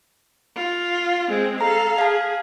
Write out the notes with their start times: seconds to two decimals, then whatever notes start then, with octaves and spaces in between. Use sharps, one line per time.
0.56 F4
1.29 G#3 C4
1.61 A4 F5 A#5
1.98 G#4 F5 A5